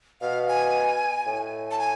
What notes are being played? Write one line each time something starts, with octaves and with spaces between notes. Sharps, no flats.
B2 F5
G#5
A2
A5
G#5